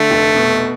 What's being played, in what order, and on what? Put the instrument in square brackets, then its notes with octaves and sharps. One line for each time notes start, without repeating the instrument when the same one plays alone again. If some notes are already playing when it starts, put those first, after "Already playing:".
Already playing: [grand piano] D3 [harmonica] A3
[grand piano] F1
B2